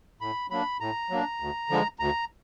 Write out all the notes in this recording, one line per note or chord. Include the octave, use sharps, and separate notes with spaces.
A2 B5
F#3 A#3 D4 B5
A2 A#5
F#3 A#3 D4
D2
D3 F3 G#3
D2 A#5